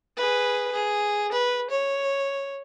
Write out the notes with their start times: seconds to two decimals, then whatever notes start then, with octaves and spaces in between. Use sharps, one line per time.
0.17 G#4 B4
0.72 G#4
1.32 B4
1.70 C#5